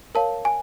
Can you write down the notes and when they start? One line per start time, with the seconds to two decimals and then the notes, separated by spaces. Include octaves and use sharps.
0.15 A#4 C#5 F5 A5
0.45 G#5